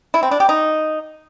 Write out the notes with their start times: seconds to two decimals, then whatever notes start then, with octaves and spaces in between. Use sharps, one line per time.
0.14 E4
0.23 C4
0.31 D4
0.40 G4
0.49 D#4